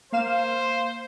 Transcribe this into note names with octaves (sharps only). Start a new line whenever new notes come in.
A#3 C5 F5 E7